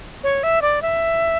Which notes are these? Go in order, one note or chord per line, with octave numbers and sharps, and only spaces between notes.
C#5
E5
D5
E5